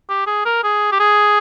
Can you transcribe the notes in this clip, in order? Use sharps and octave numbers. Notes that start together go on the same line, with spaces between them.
G4
G#4
A#4
G#4
G4
G#4